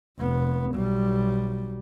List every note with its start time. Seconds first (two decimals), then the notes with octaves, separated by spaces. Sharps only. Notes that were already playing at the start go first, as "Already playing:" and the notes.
0.19 F1 B3
0.74 B1 G3